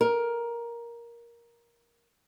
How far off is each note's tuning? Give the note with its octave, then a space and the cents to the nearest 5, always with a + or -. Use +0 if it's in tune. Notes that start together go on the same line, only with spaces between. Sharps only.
A#4 +10